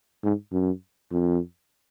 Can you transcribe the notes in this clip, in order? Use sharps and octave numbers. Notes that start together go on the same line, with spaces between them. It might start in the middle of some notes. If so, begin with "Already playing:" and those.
G#2
F#2
F2